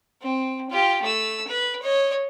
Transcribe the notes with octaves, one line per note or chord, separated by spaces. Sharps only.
C4
F4 G4
A3 E6
B4
C#5 D#5